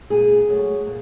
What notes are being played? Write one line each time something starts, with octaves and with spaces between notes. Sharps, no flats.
A#2 G#4
F#3 A3
A#2